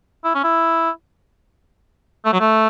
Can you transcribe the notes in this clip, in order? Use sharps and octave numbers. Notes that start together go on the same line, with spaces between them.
E4
C#4
E4
A3
F#3
A3